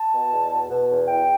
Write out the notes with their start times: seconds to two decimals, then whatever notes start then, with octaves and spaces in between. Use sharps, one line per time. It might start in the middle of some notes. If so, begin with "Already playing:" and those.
Already playing: A5
0.13 B2
0.32 E2
0.51 B2
0.70 B2
0.90 E2
1.08 E3 G5